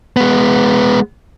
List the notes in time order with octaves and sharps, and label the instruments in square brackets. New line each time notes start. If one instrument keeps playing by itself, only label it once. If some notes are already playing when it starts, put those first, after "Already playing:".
[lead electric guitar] G#3 B3